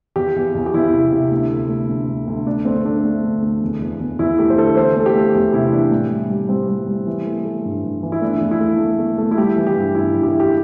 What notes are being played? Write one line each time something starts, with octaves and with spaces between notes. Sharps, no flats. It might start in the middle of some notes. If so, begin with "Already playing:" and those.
E2 G4
E2
E2
G4
E2 E4
C3
C3
D2
A3
A3
D2
D2
D2
D2 D4
A3 C4
A3 D4
A3
D2
D2
E2
E2
E2
E2 E4
A3 G4
C5
D3 A4
E3 C5
A3 A4
G4
A3
E2 G4
C3 E4
E3 D4
A2
G3
G3
G3 C4
G3
G3
E3
A3
A3
G2
G2
E3
E4
A3 D4
E2
E4
A3
A3
A3
A3
E4
G3 G4
E3
G4
G2
G2 E4
G2
G4
E3 E4
G4